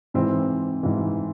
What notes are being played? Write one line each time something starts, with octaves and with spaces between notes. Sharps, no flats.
G#2 E3 C4
G#2 E3